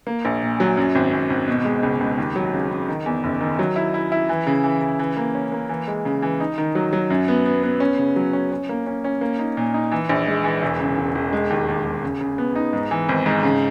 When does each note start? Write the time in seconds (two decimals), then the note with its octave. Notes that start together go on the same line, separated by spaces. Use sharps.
0.07 A#3
0.25 A#1
0.42 A#2
0.60 F#3
0.77 F#2
0.95 G#1
1.13 G#1
1.30 G#1
1.48 B2
1.65 G#3
1.83 C#2
2.00 C#2
2.18 D#2
2.36 F#3
2.53 C#3
2.70 C#3
2.88 D#3
3.06 E2
3.24 F#1
3.41 D#3
3.59 F#3
3.76 E4
3.94 E4
4.12 E4
4.29 E3
4.47 C#3
4.64 E3
4.81 C#3
4.99 E3
5.17 A#3
5.35 C#4
5.52 A#3
5.69 E3
5.87 G#3
6.05 C#3
6.22 E3
6.40 D#4
6.58 D#3
6.75 F#3
6.93 F#3
7.10 F#2
7.28 B3
7.46 B3
7.63 B3
7.80 C#4
7.98 C#3
8.16 F#3
8.33 C#4
8.52 C#4
8.69 A#3
8.86 C#4
9.04 C#4
9.21 A#3
9.39 D#4
9.57 A#2
9.74 D#4
9.92 E3
10.09 A#1
10.27 G#3
10.44 E3
10.63 E1
10.79 C#3
10.98 E1
11.15 E1
11.33 G#3
11.50 D#2
11.68 D#2
11.85 D#2
12.03 C#3
12.21 C#3
12.38 B3
12.55 D#4
12.73 G#2
12.91 E3
13.09 G#1
13.26 G#2
13.43 C#3